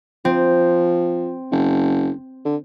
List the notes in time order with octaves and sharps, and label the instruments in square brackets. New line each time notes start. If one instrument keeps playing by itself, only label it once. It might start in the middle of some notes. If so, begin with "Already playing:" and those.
[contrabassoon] F3 [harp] C4
[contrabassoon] F#1
D3